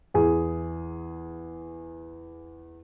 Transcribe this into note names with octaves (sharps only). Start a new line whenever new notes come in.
E2 G#4